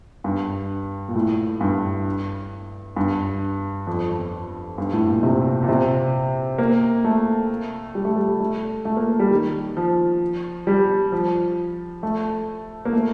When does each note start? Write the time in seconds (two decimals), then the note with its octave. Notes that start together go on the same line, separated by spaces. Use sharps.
0.24 G2
1.08 A#2
1.15 A2
1.61 G2
2.96 G2
3.87 F2
4.11 F2
4.78 G2
4.93 A2
5.08 A#2
5.23 C3
5.63 A#2
5.69 C3
6.58 A#3
7.04 A3
7.95 G3
8.05 A3
8.16 G3
8.40 A3
8.85 A3
8.97 A#3
9.20 G3
9.30 D#3
9.77 F3
10.67 G3
11.12 F3
12.03 A3
12.85 A#3
12.93 A3